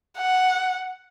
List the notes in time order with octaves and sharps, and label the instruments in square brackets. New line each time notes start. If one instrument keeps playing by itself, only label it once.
[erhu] F#5